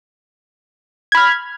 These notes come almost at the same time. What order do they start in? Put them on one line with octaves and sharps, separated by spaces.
G#6 B5 F6